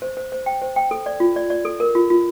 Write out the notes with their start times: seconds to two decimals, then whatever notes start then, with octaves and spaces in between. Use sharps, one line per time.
0.02 C5
0.17 C5
0.32 C5
0.46 G5
0.62 C5
0.76 G5
0.91 A4
1.06 D5
1.20 F4
1.36 D5
1.50 D5
1.65 A4
1.80 A#4
1.95 F4
2.10 F4